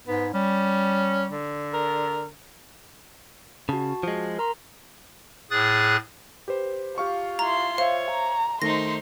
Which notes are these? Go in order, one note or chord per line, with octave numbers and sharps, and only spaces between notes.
G#2 B3
G3 C#4
D3
A#4
C#3 F#4 A5
F3 G#3
A#4 A#5 C6
A2 G#4 D#6 F#6 A6
G4 B4 C5
F4 G4 F5 C#6
E4 A#5 C6
C5 C#5 E5 F5
A#5
D#3 A3 D#4 C5 C6 A#6